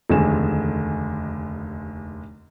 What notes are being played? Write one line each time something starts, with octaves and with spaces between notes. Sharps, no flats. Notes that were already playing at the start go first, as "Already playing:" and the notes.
F1 D#2 D3 G#3 G#5 E7